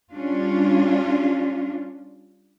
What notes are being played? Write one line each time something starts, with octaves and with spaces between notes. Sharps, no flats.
G3 C#4 D4 F4